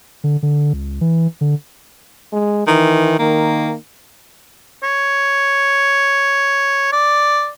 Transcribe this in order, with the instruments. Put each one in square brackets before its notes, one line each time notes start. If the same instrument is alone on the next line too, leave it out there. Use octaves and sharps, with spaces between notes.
[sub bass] D3
D3
C#2
E3
D3
[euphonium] G#3
[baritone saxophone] D#3 [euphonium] E3
[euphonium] D#3 [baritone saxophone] A#3
[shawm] C#5
D5